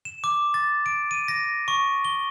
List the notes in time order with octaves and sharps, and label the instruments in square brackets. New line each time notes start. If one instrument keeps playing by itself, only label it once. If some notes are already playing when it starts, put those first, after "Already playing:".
[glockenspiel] E7
D6
A6
D7
D#7
A#6
C#6
G7